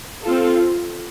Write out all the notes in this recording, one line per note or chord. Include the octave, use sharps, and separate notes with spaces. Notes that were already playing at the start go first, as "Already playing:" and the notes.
C4 F4 A4